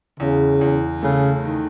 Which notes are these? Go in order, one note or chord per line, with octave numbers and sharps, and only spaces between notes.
E2 C#3
E2
C#3 A3
D#3